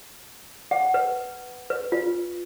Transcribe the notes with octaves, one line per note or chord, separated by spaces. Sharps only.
F#5
B4
B4
F4